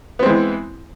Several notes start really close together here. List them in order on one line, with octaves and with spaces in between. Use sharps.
B3 C4 G#3 E3